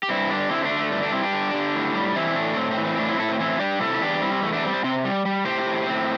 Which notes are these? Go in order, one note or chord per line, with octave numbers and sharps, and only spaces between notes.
G4
G2 C4 E4
D3 D4 G4
D3 C4 E4
A3 D4
D3
A3
G2 A3
A3 D4
G3 C4 E4
D4 G4
D3
D3
A2
G3
E3 C4 E4
A2 A3 D4
A2 C4
C4
E3
C4
A2 A3 D4
C4 E4
A2 E4 A4
C4
E3 C4 E4
G3 D4 G4
C3 E4 A4
E4
E2 D4 G4
G3 C4 E4
C4
E2 A3
A3 D4
G3 C4
C4
C3 C4
G3
G3
A2 G4 C5
A2
A2 C4